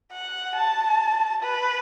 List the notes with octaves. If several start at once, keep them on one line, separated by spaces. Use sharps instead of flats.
F#5
A5
B4